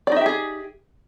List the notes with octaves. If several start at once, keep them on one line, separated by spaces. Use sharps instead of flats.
D#4 G4 G#4 D5 E5